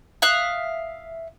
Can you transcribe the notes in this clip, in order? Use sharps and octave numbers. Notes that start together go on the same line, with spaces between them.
E5 F5 D#6 F#6